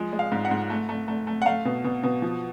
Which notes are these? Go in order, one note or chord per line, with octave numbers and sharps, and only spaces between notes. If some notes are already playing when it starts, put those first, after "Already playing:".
Already playing: F3 G#3
G#3
F5
G#2
F#5
G#2
A3
A3
A3
A3
F#5
A3 F5
B2
B2
B2
F3